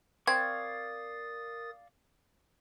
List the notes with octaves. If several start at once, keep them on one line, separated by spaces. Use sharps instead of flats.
C4 A#4 D5 F5 C#6 D#6 G#6 A6